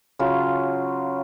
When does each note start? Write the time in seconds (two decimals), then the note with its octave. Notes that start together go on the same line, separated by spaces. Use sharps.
0.19 C#3 F#3 F4